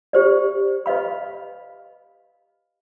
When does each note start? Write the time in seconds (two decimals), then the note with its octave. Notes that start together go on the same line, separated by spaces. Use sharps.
0.13 G4 C5 D5
0.86 B4 D#5 F5 B5